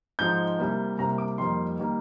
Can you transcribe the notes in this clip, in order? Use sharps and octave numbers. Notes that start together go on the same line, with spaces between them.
G#2 F3 G#3 D#4 G6
C2 C3 G3 A#3
C2 C3 G3 A#3 A#5
D6
F2 D#3 G3 A#3 C6
D#3 G3 A#3